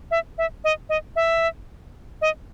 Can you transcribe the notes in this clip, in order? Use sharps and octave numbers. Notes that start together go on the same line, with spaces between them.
E5
E5
D#5
D#5
E5
D#5